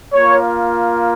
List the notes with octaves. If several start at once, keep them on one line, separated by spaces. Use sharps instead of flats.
A#3 F4 C#5